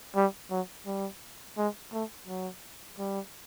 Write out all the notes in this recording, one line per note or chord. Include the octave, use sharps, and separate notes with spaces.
G3
F#3
G3
G#3
A3
F#3
G3